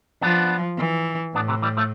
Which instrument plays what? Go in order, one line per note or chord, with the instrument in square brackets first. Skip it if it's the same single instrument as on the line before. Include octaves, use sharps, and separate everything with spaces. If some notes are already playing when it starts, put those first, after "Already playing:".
[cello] F3 [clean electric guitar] B3 D4
[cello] E3
[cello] A2 [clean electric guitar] B3 D4
[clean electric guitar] C3 E3
E3 G3
F3 A3